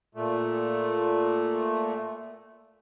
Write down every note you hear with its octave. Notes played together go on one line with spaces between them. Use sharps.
A#2 A3